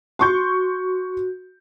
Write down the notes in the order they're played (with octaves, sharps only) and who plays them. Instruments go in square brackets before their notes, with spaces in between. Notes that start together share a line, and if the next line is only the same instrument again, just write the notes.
[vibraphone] F#4 [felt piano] C6 C#6 G6